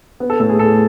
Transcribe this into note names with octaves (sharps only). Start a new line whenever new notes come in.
B3
A4
A2 A4
G#4
A2 A4